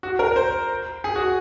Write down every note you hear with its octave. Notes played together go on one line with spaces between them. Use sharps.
F#4
A#4
C5
G#4
F#4